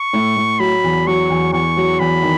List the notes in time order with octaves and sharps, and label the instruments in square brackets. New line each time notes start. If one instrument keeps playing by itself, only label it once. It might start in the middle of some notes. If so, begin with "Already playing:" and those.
Already playing: [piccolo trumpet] C#6
[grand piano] A2
A2
[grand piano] F#3 [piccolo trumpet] B5
[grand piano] E2
[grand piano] F#3 [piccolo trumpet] C#6
[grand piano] E2
[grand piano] E2 [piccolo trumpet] C#6
[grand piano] F#3
[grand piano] E2 [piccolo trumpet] B5
[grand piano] D#3